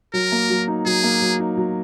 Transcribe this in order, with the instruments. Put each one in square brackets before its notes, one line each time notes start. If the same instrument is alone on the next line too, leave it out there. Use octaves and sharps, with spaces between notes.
[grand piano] F#3 [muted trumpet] A#4
[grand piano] A#3
F#3
D#4
[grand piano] F#3 [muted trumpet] G#4
[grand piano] A#3
F#3
D#4
F#3